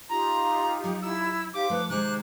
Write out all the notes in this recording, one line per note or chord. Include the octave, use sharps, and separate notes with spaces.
D#4 F4 G4 A#5 C6
F#3
E4 E6
D#4 G4 C5 F5 D6
F3 A3 B4
C3 D#3 G#3 C5 G#5 D6 F#6